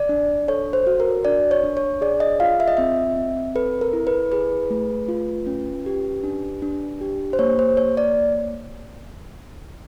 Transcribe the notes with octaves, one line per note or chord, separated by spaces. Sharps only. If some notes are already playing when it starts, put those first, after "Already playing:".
Already playing: D5
D4
A4 C#5
C5
F#4
A#4
D4 D5
C#5
D4
C#5
G#4 D5
D#5
F4 F5
E5
D#5
C4 E5
C4
A4 B4
A#4
E4
B4
G#4 B4
A3
F4
C#4
G4
D4
D4
G4
C5
A#3 C#5
C5
A#3 C#5
D5